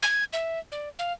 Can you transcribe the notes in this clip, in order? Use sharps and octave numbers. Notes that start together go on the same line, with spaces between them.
G#6
E5
D5
F5